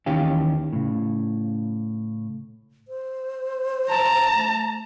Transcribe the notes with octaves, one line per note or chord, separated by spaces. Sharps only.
D#2 D#3 E3 C#4 G4 F5
A2 C#3
C5
A5 A#5
A3